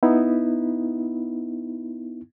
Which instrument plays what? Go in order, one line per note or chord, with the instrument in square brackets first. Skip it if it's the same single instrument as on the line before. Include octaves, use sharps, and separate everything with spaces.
[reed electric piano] B3 D#4 E4